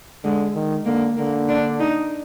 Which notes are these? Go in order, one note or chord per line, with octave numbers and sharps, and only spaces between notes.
D3 G#3
D#3
D3 A#3
D3 A#3
D4
D#4